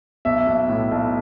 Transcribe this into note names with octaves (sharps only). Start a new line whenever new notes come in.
B1 E5
B1
A2
B1